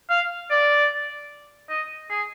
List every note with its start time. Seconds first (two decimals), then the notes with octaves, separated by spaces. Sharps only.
0.10 F5
0.50 D5
1.69 D#5
2.10 G#4